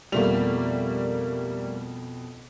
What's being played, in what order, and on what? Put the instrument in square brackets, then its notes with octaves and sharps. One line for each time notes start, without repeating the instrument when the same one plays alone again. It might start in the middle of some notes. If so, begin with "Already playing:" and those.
[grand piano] F2 B2 F7 [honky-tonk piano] G3 A3 A#3